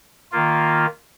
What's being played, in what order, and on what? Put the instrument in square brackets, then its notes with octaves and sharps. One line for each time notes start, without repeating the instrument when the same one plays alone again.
[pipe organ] D#3 A#3 F4